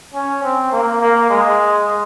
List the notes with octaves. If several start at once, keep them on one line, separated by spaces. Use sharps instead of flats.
C#4
C4
A#3
A#3
G#3